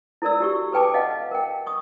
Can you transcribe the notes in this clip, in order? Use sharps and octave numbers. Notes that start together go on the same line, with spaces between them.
E4 A4 A#4 D5 E6
F#4 G4 C#6
A4 B4 G5 A5 D6
D#5 F5 F#5
A#4 G5
C#6 D#6